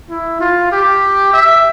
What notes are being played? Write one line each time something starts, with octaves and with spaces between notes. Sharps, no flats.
E4
F4
G4
E5